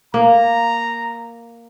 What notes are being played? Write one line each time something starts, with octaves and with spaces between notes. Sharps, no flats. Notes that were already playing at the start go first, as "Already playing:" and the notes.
A#3 A#5